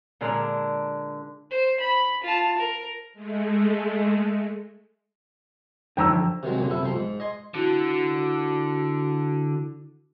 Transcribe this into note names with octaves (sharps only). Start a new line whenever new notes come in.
A#2 D3 G#3 D4 A#4
C5
B5
F4 A5
A#4
G#3 A3
D3 F3 F#3 G5 A#5 E6
C3 D#3 F#3 G#3
F#2 A#2 D3
C3 E4 A4
B1 F3 C6
G#2
D#5 G#5 C6
D3 E4 F#4